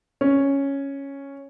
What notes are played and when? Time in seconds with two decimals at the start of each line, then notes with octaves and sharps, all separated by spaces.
0.21 C#4